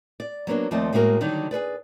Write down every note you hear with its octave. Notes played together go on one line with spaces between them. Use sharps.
D5
F#3 A#3 B3 D4
D#2 F3 A3 C4 D5 D#5
A2 G#3 A#3 F#4 G4 A#4
D3 D#3 F#3 G3 D#4
G#4 A4 B4 D5